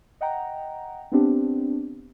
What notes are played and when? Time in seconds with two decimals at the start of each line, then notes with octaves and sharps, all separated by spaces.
0.21 D#5 F#5 G5 A#5
1.12 B3 C4 D4 G4